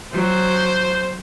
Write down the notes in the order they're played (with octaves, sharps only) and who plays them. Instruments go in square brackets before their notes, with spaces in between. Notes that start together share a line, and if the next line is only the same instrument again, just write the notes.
[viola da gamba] F#3 [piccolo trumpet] C5